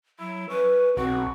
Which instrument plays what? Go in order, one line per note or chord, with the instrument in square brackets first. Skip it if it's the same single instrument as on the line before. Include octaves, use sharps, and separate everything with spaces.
[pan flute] F#3 [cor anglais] E4
[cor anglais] C#4 [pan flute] B4
[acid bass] B1 [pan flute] C4 [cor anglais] F#4